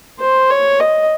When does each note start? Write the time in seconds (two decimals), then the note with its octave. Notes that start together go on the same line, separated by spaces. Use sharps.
0.20 C5
0.50 C#5
0.80 D#5